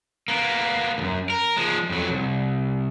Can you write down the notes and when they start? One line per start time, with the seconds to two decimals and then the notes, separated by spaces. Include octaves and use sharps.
0.28 A#3 B3
0.98 C#2 F#2
1.30 A#4
1.57 F3 G#3
1.89 F2 F#3
2.11 C2